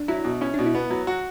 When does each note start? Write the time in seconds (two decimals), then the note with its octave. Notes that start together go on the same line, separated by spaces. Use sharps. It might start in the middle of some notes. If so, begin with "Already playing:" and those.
Already playing: D4
0.08 F#3 E4
0.24 B2
0.41 C#4 E4
0.54 B2 D4
0.66 E4
0.75 B3
0.91 F#3
1.07 F#4